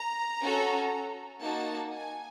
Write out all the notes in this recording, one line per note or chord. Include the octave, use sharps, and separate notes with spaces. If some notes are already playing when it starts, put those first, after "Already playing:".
Already playing: A#5
C#4 F#4 A4
A#3 D#4 F#4 A5
G#5